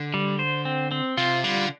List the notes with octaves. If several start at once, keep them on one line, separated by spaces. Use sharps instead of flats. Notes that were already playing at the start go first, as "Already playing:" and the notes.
Already playing: D3
G3
C5
C4
C4
C3 F4
D3 G3